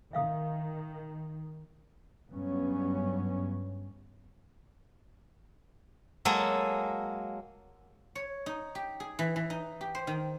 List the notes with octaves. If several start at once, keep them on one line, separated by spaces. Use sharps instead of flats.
D#3 E5 F5 D#6
G2 F#3 B3 C#4
F#3 G#3 A#3 A4
C#5
D#4
G4
G#4
E3
E3
D#4
G4
C5
D#3